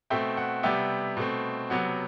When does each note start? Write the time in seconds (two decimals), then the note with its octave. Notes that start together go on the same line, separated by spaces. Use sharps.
0.10 B2 A3 C4 E5 G5
0.37 F#5
0.63 C3 G3 B3 E5 G5
1.17 B2 A3 C4
1.70 C3 F#3 B3 F#5